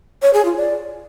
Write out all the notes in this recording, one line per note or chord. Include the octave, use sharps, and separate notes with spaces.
C#5
G#4
F4
D5